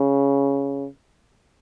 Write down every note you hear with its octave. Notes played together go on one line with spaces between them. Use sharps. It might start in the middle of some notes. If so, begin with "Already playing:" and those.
Already playing: C#3